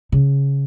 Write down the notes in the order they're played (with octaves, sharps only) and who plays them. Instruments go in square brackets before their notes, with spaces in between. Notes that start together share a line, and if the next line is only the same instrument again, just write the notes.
[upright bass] C#3